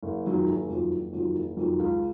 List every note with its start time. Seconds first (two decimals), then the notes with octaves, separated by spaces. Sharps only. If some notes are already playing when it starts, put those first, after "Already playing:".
0.03 F#1
0.24 F2 D#3 F#3
0.47 F#1
0.69 F2 D#3 F#3
0.90 F#1
1.13 F2 D#3 F#3
1.35 F#1
1.57 F2 D#3 F#3
1.79 C#2